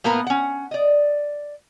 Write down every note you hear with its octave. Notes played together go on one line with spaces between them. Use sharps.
A2 A#3 B3 A#4 B4 A#5
C#4 F#5
D5 D#5